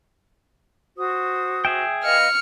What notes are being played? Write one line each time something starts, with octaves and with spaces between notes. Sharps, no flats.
F#4 C5 D#6
G#4 E5 G5
B4 D#5 F5 F6 C#7